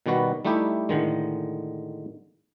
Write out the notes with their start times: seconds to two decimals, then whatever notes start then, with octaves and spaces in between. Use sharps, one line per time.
0.06 B2 D#3 G3 F#4 B4
0.45 G3 A3 D#4 E4 G4
0.89 A2 D3 D#3 G#3